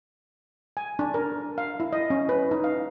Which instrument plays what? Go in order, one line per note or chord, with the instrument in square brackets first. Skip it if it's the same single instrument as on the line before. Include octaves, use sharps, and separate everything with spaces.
[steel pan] G#5
D4
A#4
F5
E4
D#5
C#4
B4
D#4
F5